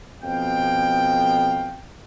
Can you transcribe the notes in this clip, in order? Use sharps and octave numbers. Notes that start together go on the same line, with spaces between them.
F2 B2 F5 G5